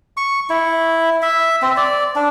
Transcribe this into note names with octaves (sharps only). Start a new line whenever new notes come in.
C#6
E4
E5
C4
D5
D4